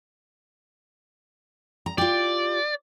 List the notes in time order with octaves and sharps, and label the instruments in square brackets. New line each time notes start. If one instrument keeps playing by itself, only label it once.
[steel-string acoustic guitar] A#5
[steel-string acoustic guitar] F4 G4 [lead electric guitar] D5